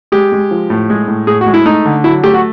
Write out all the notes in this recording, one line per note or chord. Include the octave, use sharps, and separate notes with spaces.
G#3 G4
G#3
F3
A2
G#3
A2
A2 G#4
F#4
G#3
E4
A3 D#4
D3
F#3 E4
A3 G4
F#4